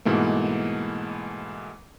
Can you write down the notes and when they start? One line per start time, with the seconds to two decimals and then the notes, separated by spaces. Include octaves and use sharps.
0.05 G#2 B2 E3 A3 A#3